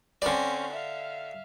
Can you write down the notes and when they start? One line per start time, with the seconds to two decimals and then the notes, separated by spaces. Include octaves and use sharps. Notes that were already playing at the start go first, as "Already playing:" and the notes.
0.22 D3 C4 C#4 D5
0.72 E5 F5